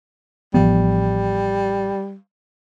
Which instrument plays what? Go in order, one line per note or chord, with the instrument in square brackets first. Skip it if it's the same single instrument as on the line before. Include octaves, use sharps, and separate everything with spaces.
[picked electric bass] A1 F3 B3 [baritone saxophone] G3